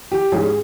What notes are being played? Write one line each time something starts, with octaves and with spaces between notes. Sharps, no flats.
G4
G#2 G3 C#4 G#4